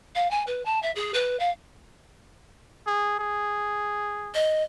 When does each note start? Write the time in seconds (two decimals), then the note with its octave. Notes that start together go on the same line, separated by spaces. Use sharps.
0.15 F5
0.30 G#5
0.47 B4
0.65 A5
0.82 E5
0.95 G#4
1.14 B4
1.39 F5
2.87 G#4
3.19 G#4
4.35 D#5